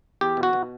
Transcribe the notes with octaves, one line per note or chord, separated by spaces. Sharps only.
E2 G4
B2
F#4
B2